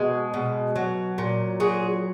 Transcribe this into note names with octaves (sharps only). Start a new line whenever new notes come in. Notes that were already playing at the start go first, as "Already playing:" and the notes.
Already playing: B2 G#3
B2
F#3
A#2
F#3 G#4